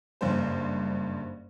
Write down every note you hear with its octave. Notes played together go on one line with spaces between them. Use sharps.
F#1 G2 C5